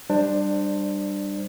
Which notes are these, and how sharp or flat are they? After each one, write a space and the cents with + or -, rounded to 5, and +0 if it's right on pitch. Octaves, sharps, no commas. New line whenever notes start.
G3 +0 D4 +20 C5 +0